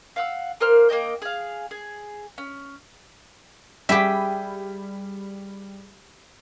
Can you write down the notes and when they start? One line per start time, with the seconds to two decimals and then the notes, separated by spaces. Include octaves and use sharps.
0.16 F5 F#5 E6
0.60 A#3 A#4 C5 F6
0.89 A#3 C5 D#5 G5
1.22 G#4 F5
1.71 G#4
2.38 C#4
3.89 G3 G4 G#4 E5 G5 B5 D#7